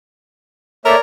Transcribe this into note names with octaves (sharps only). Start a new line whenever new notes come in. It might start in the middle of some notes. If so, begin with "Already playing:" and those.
A3 A#3 A#4 C#5 D5 E5